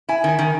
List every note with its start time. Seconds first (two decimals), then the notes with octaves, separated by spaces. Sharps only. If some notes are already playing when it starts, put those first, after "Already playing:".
0.09 E4 G#5
0.24 D#3 G#5
0.39 D#3